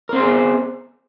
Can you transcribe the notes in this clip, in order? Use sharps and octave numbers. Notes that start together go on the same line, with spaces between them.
B3 C4 G#4 A#4 C5